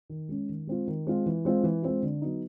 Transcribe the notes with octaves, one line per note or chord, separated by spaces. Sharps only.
D#3
G#3 C#4
D#3
G#3 C4 F4
D#3
G#3 C4 F4
E3
G#3 C4 F4
E3
G#3 C4 F4
D3
F#3 B3 D#4